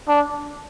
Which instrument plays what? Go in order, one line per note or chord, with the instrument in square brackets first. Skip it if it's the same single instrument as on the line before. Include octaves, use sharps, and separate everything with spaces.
[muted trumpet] D4